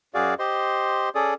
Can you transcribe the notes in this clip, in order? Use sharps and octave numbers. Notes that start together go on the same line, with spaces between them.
F#2 F#4 G#4 D5 F5
G4 C5 D#5 C6
C#4 G#4 A4 D5 D#6